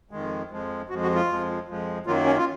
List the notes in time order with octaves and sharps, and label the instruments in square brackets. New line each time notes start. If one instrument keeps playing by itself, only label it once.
[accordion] F2 D#3 G#3
F2 F3 G#3
F2 F3 G#3 F#4
F#4
F4
F2 F3 G#3
F2 F3 G#3
F#2 D#3 F#3 A#3 F4
C#4
F4